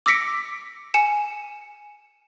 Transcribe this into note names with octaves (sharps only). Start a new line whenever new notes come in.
D6 E6 A#6 B6 C#7 D7
G#5 C#7 E7